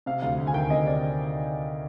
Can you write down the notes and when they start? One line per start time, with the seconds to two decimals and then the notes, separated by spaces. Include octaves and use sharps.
0.06 C3 F5
0.22 D2 F5
0.38 D2
0.47 G#5
0.54 D#3 G5
0.70 C3 D#5
0.86 D5